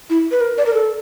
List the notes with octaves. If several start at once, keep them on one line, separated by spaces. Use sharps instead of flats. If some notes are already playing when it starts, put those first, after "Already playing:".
E4
B4
A#4
D5
A#4
A4